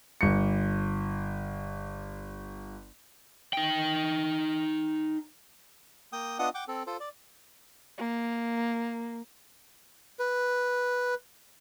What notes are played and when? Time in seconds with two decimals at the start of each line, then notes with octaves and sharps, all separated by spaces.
0.21 G1 C#7
3.53 D#4 G5
6.13 A#3 G5 D#6
6.39 B3 D4 F4 D#5 F#5 D#6
6.54 F#5 G5 D6
6.68 C4 A4
6.87 F4 A4 C5
7.00 D5
7.98 A#3
10.19 B4